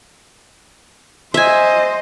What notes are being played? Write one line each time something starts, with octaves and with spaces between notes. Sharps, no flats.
C5 D#5 E5 G#5